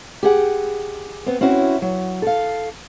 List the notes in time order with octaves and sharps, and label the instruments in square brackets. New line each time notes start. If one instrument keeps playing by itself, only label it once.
[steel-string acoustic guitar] G4 G#4 F#5
B3 C4
C4 C#4 E4 F#4
F#3
A4 F5